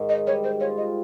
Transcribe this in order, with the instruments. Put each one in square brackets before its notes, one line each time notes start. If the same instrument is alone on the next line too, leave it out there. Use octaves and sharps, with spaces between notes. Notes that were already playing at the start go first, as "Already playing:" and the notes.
Already playing: [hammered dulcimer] G#2 D#3
[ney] D#5
[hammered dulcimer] G3 [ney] C#5
[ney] C5
[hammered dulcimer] F4 [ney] C#5
[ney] D#5